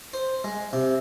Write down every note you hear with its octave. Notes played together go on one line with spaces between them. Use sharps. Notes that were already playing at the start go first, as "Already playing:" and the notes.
C5
G#3
C3